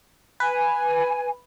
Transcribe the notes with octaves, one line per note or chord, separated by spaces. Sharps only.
B4 G#5